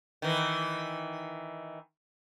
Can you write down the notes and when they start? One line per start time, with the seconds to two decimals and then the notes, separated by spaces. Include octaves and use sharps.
0.22 D#3 E3